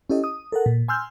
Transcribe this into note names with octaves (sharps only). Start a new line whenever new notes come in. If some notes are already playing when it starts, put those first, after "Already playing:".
C#4 E4 G4 A4 D#5
D#6
A4 A#4 F#5
A#2
G#5 C6 E6 F6 G6